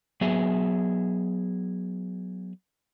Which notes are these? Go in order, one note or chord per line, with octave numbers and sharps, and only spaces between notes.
F#3 B3 G#4 E5